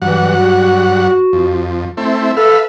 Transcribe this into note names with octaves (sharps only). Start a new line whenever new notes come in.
G2 E3 F#3 F#5
F#4
F2
A3 C4 E4
A4 B4 E5 F5